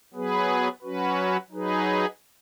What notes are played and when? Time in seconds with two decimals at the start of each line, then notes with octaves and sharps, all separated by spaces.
0.14 F#3 B3 G#4 B4
0.82 F#3 C#4 F#4 B4
1.50 F#3 D#4 G#4 B4